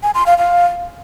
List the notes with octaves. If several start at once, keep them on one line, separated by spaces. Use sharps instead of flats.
G#5
C6
F5
F5